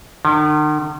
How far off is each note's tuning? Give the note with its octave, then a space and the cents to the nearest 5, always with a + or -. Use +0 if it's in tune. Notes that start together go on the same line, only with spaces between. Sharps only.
D#3 -45